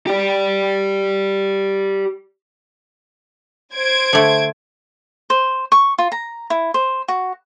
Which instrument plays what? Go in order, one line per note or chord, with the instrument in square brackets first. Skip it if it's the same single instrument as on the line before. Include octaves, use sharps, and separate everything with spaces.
[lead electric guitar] G4 D5
[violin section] C5 G#6 D7
[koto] D3 A3
[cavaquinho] C5
C#6
F4
A#5
E4
C5
F#4